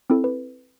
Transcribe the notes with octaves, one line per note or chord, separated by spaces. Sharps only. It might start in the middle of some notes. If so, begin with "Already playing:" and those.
C4 E4 A4
B4